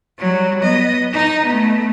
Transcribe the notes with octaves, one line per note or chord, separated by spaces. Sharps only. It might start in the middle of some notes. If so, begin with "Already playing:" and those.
F#3 G3
B3 D#5
D#4 D#5
A3 B3